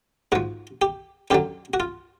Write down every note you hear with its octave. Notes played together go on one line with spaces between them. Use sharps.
G#2 F3 F#4
G4
F#2 D3 F#3 G4
F#4
F4